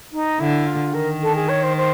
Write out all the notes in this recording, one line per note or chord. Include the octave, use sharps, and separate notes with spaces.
D#4
D3 E4
F4
D#3 A#4
A4
G#4
C#5
C5
C5